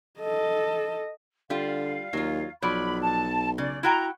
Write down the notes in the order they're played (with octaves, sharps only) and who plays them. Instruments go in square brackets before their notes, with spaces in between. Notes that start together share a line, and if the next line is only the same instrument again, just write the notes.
[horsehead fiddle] A4 D#5
[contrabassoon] D3 [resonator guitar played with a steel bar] G3 F4 [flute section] F5
[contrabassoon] D#2 [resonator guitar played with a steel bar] F#3 F4
[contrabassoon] B1 [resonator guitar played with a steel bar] F3 F#3 D5 [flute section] B5
[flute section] A5
[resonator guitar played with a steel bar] C#3 [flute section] D5
[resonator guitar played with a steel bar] E4 F#4 G5 [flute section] A#5